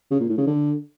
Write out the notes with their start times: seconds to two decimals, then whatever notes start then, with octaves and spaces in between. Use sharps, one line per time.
0.11 C#3
0.20 A#2
0.29 A2
0.38 C#3
0.47 D3